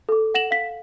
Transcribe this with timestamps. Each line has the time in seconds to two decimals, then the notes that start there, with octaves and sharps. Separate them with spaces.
0.09 A4 D6
0.34 F#5 A#6 E7 F#7
0.51 F5 B6